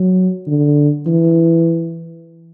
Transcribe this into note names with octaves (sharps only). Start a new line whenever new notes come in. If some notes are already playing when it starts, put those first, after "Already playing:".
Already playing: F#3
D3
E3